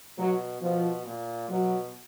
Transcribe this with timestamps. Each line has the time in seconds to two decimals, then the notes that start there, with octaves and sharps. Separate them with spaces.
0.18 B2 F#3
0.62 B2 F3
1.05 A#2
1.49 B2 F#3